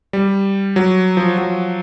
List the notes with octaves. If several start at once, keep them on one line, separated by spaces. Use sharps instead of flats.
G3
F#3
F3
F#3